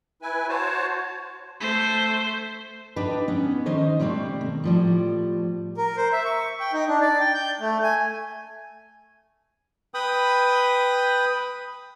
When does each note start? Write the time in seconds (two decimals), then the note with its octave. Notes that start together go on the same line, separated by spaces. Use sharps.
0.22 E4 B4 G#5
0.49 F#4 C5 C#5 A5
1.60 A3 C5
2.96 D4 D#4 G4 B4
3.28 B3 C#4 D#4
3.66 D#3 C#4 D#4 C5 D#5
4.00 B2 G3 A3 C4
4.41 D#3
4.64 A2 F3 G3
5.77 A#4
5.97 C5
6.13 E5
6.25 C#6
6.60 G5
6.73 D#4
6.88 D4
7.01 D5
7.20 G5
7.34 G6
7.60 A3
7.83 G#5
9.94 B4 G5 B5 D#6